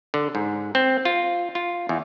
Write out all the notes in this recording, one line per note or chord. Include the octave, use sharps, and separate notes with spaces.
D3
G#2
C4
F4
F4
E2